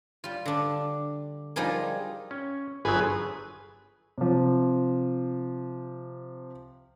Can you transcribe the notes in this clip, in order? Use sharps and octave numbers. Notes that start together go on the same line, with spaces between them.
G3 F4
D3 D4
F3 G3 D#4 F4 G#4 A#4
C#4
G1 F3 F#3 G#4 B4
C3 F3